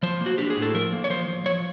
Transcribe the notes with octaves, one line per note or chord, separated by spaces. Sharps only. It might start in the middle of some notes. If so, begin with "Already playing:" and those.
F3 C5
A#3
F#4
D4 G4
G#4
A2
A4
F3 A#4
A#3
C#5
F3 C5
F3
F3 C#5